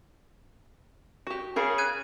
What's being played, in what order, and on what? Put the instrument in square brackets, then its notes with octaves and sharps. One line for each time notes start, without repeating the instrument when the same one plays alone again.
[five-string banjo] F#4 G4
[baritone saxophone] C#3 [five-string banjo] G#4 A#4 F5
[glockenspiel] F#6 G#6 D#7